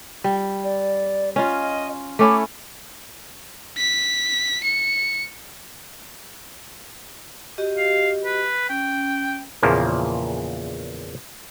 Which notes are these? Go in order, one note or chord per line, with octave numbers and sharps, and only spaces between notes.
G3
D5
C#4 F4 D#5
A3 C#4 E4 D6
B6
C#7
F#4 G4 D#5
F5
B4
C#4 G5
E2 A#2 C#3 F3 A#3